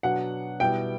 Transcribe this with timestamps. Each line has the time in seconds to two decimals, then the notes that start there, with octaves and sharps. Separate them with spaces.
0.03 B2 F#3 B3 D4 F#5
0.60 B2 G3 B3 E4 G5